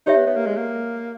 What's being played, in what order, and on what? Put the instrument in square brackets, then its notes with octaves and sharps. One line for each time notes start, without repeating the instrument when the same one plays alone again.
[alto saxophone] D#4 [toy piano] G4 C#5 E5
[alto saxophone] B3
B3
A#3
G#3
A#3